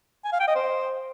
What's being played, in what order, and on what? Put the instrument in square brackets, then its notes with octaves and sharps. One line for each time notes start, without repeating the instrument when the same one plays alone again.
[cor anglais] G#5
F5
G5
D#5
C5